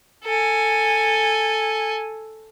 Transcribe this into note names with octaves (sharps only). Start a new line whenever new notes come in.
A4 G#5